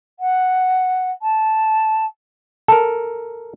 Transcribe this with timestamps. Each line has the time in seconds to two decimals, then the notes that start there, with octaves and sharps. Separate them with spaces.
0.19 F#5
1.21 A5
2.68 A4 A#4 A5